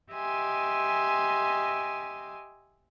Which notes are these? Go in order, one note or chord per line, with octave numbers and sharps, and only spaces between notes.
G4 D#5 E5 G#5 C6